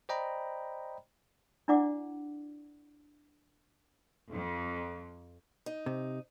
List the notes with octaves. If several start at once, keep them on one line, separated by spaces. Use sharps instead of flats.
C5 D5 D#5 G5 A#5 B5
D4 E4 D5 F#5 D6
F2
D#4
C3